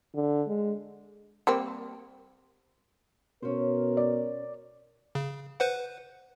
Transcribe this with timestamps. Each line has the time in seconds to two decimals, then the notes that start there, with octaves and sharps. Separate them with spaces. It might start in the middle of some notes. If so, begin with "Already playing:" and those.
0.15 D3
0.48 G#3
1.47 G3 A#3 C4
3.43 B2 C#4 A#4 C5
3.97 D5
5.15 C#3
5.60 B4 C5 F#5